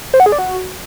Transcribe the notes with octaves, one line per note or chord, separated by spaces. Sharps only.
C5
F#5
G#4
D5
F#4